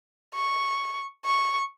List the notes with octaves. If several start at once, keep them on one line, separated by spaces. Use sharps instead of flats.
C#6
C#6